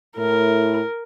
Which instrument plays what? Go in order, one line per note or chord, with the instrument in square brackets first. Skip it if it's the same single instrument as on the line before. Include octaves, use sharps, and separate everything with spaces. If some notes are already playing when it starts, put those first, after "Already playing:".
[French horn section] A2 E4 [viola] A#4